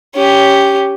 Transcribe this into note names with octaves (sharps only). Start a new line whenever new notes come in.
C#4 G4